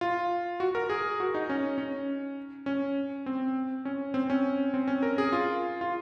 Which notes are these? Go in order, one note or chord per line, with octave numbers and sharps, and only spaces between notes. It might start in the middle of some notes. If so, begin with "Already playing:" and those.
F4
F#4
A#4
G#4
F#4
D#4
C#4
C#4
C#4
C4
C#4
C4
C#4
C4
C#4
A#4
G#4
F4
F4